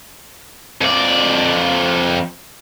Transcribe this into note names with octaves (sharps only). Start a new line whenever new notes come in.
F2 D5